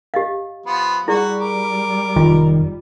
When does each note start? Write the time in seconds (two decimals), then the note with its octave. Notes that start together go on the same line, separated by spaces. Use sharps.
0.14 G4 D#5 F5
0.66 F3 B3
1.08 G3 E4 F#4 G#4 D5
1.39 A#4 D6
2.16 F1 D#3 F4